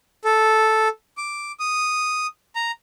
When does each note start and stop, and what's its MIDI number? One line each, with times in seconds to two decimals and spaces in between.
0.24 0.88 69
1.17 1.52 86
1.59 2.27 87
2.55 2.71 82